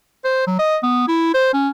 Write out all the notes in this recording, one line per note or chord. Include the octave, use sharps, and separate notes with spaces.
C5
F#3
D#5
B3
E4
C5
C#4